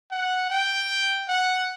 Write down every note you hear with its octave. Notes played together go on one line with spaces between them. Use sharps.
F#5
G5
F#5